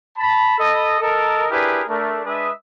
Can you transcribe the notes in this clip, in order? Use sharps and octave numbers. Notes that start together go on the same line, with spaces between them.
A5 B5
A4 D#5 B5
A4 A#4 D#5
D4 E4 G4 G#4 A#4 B4
A3 D4 A#4
G#3 D4 B4 E5 D#6